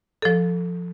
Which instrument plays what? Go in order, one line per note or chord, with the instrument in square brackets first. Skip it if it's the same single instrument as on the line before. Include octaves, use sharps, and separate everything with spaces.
[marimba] F3 A4